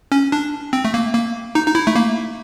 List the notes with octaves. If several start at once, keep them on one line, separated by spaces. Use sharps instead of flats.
C#4
D4
C4
A3
A#3
A#3
D#4
D#4
E4
A3
A#3